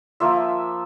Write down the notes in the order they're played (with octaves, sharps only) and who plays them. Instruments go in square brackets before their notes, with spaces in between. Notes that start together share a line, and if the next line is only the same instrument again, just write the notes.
[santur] F3 A#3 F4 E5